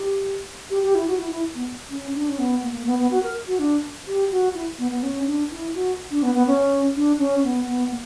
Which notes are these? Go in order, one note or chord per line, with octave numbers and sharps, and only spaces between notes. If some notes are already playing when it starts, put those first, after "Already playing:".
Already playing: G4
G4
G4
E4
F#4
E4
E4
B3
C#4
D4
C#4
B3
A#3
A#3
B3
B3
F#4
A#4
F#4
D4
G4
F#4
E4
B3
B3
C#4
D4
E4
F#4
D4
B3
B3
C#4
D4
C#4
B3
B3
A#3